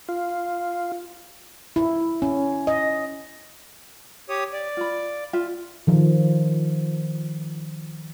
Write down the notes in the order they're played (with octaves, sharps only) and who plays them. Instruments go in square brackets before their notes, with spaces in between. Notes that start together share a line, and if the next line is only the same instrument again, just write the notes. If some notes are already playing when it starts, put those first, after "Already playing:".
[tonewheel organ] F4
[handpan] E4
C#4
D#5
[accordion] G4 C#5 D#6
D5
[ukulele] F4 B5
F4 E5
[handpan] D#3 F3